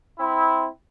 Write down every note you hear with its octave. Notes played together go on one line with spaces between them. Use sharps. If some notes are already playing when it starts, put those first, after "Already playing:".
C4 E4